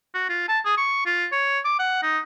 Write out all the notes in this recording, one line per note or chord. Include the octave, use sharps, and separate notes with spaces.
F#4
F4
A5
G#4
C#6
F4
C#5
D6
F#5
D#4